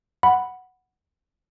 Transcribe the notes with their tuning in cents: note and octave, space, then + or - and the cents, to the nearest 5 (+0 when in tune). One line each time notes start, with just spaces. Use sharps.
F#5 +0 B5 +0